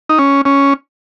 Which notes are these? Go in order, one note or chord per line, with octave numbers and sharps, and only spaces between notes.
D#4
C#4
C#4